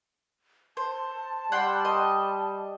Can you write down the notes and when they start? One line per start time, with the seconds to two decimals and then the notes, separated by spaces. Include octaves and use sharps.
0.77 C5 A5
1.52 G3 F#5 G5 C6
1.85 D#5